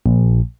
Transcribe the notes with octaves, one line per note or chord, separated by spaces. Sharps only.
A#1